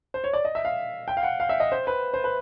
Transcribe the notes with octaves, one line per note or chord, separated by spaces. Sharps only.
C5
C#5
D5
D#5
E5
F5
G5
F5
F#5
F5
E5
D#5
C5
B4
C5
B4